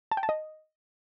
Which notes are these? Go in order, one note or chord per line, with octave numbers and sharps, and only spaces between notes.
A5
G5
A5
D#5